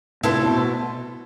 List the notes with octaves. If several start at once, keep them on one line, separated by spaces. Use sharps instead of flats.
A2 C3 E4 A4 C5
B2